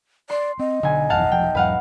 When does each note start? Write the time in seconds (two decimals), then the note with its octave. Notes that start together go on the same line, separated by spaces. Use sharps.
0.30 D5 C6
0.59 C4 D#5
0.83 B1 D3 G#5
1.10 G#1 F2 E3 F5 F#5 A5
1.32 E1 F3 G5
1.55 E2 G#2 F#3 B4 F5 F#5